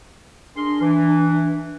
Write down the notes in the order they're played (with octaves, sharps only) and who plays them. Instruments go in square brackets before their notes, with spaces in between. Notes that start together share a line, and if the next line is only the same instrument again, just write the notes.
[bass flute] D4 [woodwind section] G#4 A#4 C6
[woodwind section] E3